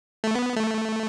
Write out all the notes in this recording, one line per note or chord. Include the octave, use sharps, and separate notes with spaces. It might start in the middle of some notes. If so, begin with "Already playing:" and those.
A3
B3
A3